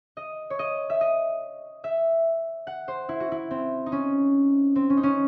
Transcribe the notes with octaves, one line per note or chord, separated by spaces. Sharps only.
D#5
C#5
D#5
E5
D#5
E5
F#5
C5
E4
F#4
E4
C4
D#4
C#4
C4
C#4
D#4
C#4